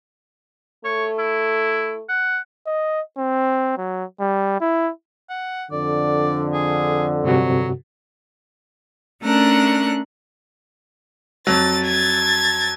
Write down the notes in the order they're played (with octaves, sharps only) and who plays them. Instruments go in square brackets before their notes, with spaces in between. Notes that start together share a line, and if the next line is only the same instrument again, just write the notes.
[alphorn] A3 [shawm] C#5
[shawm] E4
F#5
[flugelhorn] D#5
C4
F#3
G3
E4
[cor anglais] F#5
[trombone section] F2 D3 [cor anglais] D5
[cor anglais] G#4
[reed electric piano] G2 C3 F#4 [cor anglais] F#3
[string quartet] A3 C#4 D4 A#4 F#6
[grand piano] F2 F#3 [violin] A6
[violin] G#6 A6